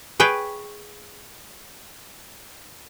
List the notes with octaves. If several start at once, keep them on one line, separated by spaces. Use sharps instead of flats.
G#4 B4 C#5 G5